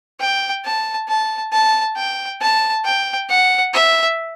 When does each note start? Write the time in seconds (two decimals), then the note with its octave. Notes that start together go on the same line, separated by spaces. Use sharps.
0.20 G5
0.65 A5
1.09 A5
1.52 A5
1.96 G5
2.41 A5
2.84 G5
3.29 F#5
3.73 E5